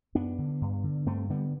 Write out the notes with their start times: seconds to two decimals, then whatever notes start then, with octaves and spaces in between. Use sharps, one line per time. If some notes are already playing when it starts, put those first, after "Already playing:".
0.15 F#2 B3 D4
0.38 D3
0.61 G2
0.84 D3
1.06 G2 A3 C4
1.30 D3 G3 B3